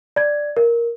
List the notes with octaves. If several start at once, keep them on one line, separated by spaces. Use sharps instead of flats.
D5 G#6
A#4